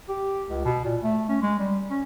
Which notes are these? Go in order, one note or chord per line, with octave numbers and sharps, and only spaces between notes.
G4
C#2
B2
A#2
A3
C#4
G#3
G3
C#4